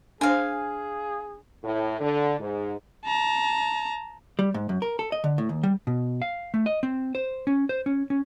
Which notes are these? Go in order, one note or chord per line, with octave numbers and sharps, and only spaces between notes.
D4 G#4 C5 F5 G#5
A2
D3
G#2
A5 A#5
G3
G#2
F#2
A#4
A4
D#5
D3
A2
D#2
G3
B2
F5
A3
D#5
C4
C5
C#4
C5
C#4
C#4